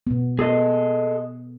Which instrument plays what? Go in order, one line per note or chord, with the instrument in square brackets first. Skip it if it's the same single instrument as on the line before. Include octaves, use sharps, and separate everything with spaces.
[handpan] B2 B3
[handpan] B3 [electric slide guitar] G#4 A4 D#5